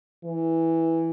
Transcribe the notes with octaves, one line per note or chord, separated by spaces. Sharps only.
E3